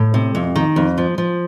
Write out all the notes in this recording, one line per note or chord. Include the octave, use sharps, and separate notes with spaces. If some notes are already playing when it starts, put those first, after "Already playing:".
Already playing: A2
C3
F2
D#3
F2
F3
F3